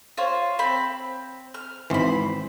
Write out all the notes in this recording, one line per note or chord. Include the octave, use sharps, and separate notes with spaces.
F4 C5 C#5
C4 B5
F6
G#1 E3 C5 B5